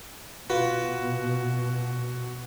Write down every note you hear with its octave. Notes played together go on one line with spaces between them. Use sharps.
B2 F4 F#4 B4